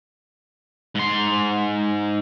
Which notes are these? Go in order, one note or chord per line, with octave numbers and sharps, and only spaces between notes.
G#2 C6